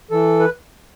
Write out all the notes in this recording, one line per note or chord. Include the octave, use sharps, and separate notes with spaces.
E3 A4
B4